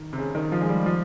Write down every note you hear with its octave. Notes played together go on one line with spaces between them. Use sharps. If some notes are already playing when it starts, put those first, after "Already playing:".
Already playing: D#3
C3
C#3
D#3
F3
G#3
G3
F3